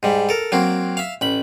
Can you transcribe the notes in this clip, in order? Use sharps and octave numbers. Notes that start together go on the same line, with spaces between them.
G#2 G3
A4 A#4
F#3 A#3 C4
E5 F5
A1 B5